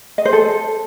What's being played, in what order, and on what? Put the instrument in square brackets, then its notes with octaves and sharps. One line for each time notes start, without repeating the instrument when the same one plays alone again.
[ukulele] D#5
C5
A4